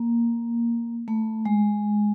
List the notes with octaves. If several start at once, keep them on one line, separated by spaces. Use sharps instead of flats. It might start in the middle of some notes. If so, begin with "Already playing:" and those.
Already playing: A#3
A3
G#3